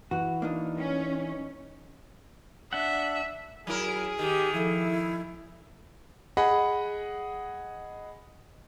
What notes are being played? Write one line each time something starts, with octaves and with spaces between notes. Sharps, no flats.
E3 F#4
A#3 D4 D#4
C#4
D4 E5 F#5
F#3 E4 G#4 A#4
D#3 G4
F3 E4 A4
G#4 D#5 F#5 B5